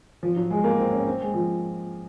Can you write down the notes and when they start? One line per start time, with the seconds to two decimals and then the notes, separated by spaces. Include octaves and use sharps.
0.23 F3
0.36 F#3
0.50 G#3
0.64 A#3
0.79 C4
0.92 C#4
1.07 C4
1.21 G#3
1.34 F3